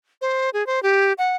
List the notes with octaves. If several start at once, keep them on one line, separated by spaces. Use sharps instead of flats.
C5
G#4
C5
G4
F#5